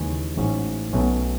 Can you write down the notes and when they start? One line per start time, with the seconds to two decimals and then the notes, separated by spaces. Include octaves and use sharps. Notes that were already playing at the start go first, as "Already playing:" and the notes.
Already playing: D#2 C#3 E3 G#3 C#4
0.37 A1 G#2 F#3 C#4
0.93 B1 B2 F#3 A3 C#4